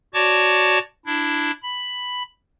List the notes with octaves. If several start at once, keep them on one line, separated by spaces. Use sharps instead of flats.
F#4 C#5 D5 A5 C#6 D6
D4 E4
B5